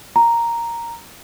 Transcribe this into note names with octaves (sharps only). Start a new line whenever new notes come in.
A#5